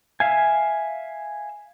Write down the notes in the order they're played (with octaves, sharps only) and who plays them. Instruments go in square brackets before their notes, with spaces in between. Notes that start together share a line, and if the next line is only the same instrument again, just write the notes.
[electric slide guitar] E5 F5 G#5